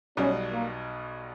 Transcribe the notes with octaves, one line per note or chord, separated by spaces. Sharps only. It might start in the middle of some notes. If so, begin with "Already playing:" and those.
B1 B2 G3 C#4
A#3